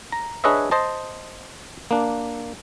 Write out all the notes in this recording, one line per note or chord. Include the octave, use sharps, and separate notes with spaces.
A#5
D4 G#4 B4 C#5 D#5 E5
C5 D#5 A5
A#3 D4